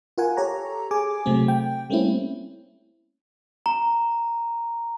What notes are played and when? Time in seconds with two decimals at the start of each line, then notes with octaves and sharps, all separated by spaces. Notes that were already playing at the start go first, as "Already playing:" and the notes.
0.18 F4 A#4 F#5 G#5
0.37 G4 A4 C#5 A#5
0.91 G#4 G#5 D6
1.26 C3 F#3 A3 C4
1.48 G5
1.90 G3 A3 A#3 C4 C#4 E4
3.66 A#5